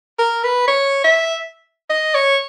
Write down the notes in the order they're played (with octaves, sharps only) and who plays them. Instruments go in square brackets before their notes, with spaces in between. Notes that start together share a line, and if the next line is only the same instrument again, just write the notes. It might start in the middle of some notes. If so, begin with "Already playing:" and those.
[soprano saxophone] A#4
B4
C#5
E5
D#5
C#5